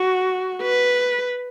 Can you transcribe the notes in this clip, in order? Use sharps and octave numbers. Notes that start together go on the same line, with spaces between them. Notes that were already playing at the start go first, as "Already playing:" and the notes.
Already playing: F#4
B4